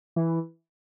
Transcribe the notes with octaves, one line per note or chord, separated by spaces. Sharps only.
E3